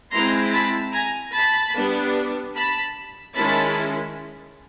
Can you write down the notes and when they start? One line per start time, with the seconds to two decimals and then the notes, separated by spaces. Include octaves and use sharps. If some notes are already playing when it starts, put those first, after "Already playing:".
0.12 G#3 C4 E4 A#5 C6
0.53 A5 B5
0.93 G#5 A#5
1.34 A5 B5
1.75 G3 B3 D4
2.55 A5 B5
3.36 D#3 G#3 C#4 E4 A5 B5